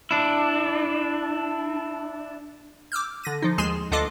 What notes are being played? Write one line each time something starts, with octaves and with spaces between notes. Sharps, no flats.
D4 E4
D6 E6 F6 G6
D3 A#6 D#7
F3 D#4
D#2 G#3 G#4 G#5 C6 E7
D2 D4 F4 A4 D#5 D6